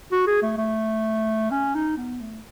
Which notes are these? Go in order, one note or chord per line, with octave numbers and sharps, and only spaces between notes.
F#4
G#4
A3
A3
C#4
D#4
B3
A3